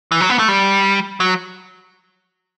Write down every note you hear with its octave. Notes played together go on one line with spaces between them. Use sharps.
E3
F#3
B3
A3
G3
F#3